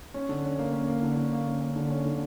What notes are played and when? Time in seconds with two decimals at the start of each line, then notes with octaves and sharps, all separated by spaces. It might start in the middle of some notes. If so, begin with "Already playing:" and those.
0.14 C#4
0.29 D3
0.44 C#4
0.59 A#3
0.73 C#4
0.88 A#3
1.03 D3
1.17 D3
1.33 A#3
1.46 C#4
1.61 C#4
1.76 D3
1.90 C#4
2.05 D3